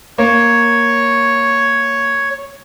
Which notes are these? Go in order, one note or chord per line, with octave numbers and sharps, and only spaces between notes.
A#3 C#5